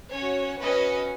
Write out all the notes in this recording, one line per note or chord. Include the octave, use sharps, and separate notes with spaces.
C#4 F#4 C#5
C#4 F#4 B4 D#5